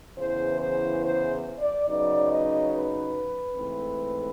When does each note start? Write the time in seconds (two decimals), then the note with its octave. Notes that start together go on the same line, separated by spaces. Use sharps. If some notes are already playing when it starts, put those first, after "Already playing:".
0.17 E2 C#3 E3 C5
0.60 C5
1.02 C5
1.59 D5
1.86 C#3 F#3 B3 D#4 D5
2.29 D#5
2.71 B4
3.56 G#2 E3 A3 C4